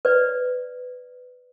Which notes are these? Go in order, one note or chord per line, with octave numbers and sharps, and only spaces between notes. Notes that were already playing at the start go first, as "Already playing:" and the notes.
B4 D5